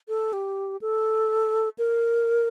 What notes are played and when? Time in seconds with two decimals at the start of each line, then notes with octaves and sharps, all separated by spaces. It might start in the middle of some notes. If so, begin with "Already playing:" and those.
0.08 A4
0.33 G4
0.81 A4
1.78 A#4